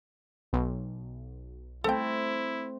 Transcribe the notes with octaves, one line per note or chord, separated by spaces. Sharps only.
B1
A3 C4 E4 A4 G5